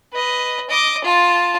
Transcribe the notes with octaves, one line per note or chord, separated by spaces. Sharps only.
B4 D#5
D#5 D6
F4 A5